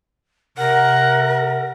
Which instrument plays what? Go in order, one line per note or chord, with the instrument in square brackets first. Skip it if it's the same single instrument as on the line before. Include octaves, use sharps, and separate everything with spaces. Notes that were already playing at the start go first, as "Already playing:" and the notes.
[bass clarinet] C3 [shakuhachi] A#4 [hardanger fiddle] F#5